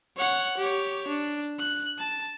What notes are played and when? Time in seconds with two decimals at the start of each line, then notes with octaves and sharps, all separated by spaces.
0.17 C#5 F#5
0.58 G4 C#5
1.08 D4
1.59 F#6
1.99 A5